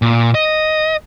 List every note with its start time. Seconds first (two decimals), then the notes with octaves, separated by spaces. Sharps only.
0.02 A#2
0.35 D#5